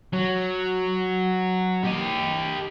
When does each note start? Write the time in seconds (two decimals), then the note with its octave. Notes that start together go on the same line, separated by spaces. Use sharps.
0.13 F#3
1.85 G4 D#5